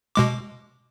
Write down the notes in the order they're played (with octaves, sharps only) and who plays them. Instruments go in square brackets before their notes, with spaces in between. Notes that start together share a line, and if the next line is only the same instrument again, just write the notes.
[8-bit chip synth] B2 G#3 D6